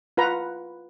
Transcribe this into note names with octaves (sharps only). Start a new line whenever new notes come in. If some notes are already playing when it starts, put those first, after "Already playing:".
F4 B4 F#5 A#5